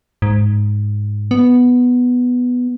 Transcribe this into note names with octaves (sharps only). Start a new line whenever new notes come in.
G#2
B3